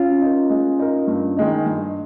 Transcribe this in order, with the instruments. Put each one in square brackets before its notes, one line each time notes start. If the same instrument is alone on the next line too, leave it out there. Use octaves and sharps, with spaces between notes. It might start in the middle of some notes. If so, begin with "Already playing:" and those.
Already playing: [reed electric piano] C#4 F4
[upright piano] D#4 A#4
G#3
D#4 A#4
G2
D#3 G#3 D#4
G2